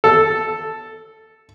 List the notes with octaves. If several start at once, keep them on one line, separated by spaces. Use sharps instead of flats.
A4